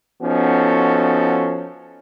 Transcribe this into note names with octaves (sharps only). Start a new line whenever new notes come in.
F3 B3 C#4 D#4 F#4 A4